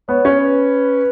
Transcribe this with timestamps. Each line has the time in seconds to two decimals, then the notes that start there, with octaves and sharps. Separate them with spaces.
0.09 B3 C#5
0.25 C#4
0.41 B4